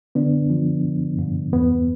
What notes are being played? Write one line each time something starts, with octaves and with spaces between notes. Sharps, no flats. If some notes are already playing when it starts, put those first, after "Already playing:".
D3 B3 D4
F3
G2
G2
E2 B3